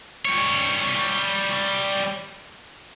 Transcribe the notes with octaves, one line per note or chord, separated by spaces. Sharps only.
G3 C#5